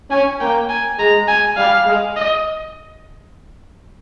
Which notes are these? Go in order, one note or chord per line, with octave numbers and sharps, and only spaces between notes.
C#4 G#5
A#3 G5
G#5
G#3 A#5
G#5
G3 F5
G#3
D#5